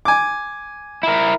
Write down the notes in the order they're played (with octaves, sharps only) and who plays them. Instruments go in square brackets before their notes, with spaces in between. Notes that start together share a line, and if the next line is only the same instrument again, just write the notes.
[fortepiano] G#5 D6
[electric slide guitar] E4 A#4